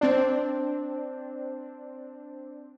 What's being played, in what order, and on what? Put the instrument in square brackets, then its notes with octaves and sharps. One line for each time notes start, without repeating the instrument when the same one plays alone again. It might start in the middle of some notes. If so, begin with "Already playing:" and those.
[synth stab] C4 D4